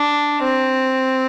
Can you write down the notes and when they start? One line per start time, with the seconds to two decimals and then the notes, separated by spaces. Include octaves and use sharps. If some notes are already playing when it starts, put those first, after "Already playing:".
Already playing: D4
0.43 C4